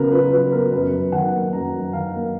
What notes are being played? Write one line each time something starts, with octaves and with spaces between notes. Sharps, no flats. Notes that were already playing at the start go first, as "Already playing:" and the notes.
Already playing: C#3 F#3 B3 A#4 B4
F4 B4
F#3 B4
B3 A#4
F#2 B4
F#2
D#3 F#5
A#3
F#2 A#5
F#2
D#3 F5
A#3